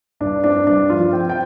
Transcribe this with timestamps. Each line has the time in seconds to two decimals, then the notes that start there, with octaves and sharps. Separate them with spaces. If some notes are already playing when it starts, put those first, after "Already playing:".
0.20 G2 D4
0.44 C4 D4
0.67 G2 D4
0.90 F3 F4
1.13 C4 G5
1.30 G5